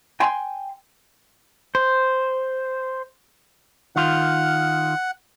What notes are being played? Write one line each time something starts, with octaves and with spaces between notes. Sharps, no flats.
G5 G#5 C6
C5
D#3 F4 F#5